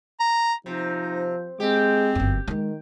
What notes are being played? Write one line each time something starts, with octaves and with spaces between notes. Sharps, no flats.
A#5
C3 F3 D#4
G#3 C4 G4
G1 F#2
D#3 F#3 G#3